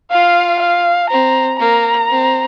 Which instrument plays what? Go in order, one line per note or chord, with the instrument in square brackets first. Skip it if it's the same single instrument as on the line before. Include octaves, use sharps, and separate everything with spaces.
[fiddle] F4 [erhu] F5
[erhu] F5
[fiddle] C4 [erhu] A#5
[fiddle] A#3 [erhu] A#5
[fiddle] C4